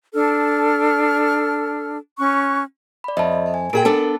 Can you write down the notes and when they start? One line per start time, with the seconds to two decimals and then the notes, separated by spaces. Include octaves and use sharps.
0.14 D4 A4 F6
2.19 C#4 C#6 F#6
3.04 D5 B5
3.17 F2 D#5 E5 A5
3.54 G#5
3.73 A#2 G#4 A#4 G5 D7
3.85 B3 D4 A4 A5